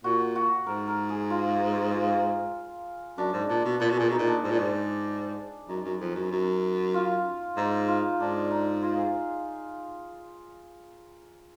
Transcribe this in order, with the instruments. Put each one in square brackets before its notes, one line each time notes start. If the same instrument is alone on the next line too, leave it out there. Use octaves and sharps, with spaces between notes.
[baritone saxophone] A#2 [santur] F#4
[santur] F#4
[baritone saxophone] G#2 [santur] A#4
[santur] A#4
G#4
F4
F4
[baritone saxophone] F#2 [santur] D4
[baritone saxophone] G#2
[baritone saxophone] A#2 [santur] D4
[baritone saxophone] B2
[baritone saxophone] A#2 [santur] B4
[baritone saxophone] B2
[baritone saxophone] A#2 [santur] G#4
[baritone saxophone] B2 [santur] D#4
[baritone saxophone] A#2
[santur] D4
[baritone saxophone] G#2
A#2
G#2
[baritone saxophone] F#2 [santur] D#4
[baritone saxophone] F#2
F2
F#2
F#2
[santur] F4
[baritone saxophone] G#2 [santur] D#4
[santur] F4
[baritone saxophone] G#2 [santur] D4
[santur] D#4
F4
G#4